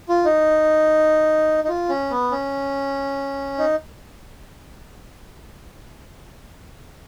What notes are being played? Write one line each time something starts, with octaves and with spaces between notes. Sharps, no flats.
F4
D#4
D#4
F4
C#4
B3
C#4
D#4